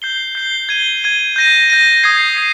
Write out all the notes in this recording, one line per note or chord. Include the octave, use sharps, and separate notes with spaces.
G6 C7 G7
G6 C7 G7
G#6 D#7 G7
G#6 D#7 G7
G6 A#6 D#7
G6 A#6 D#7
D#6 G#6 C7
D#6 G#6 C7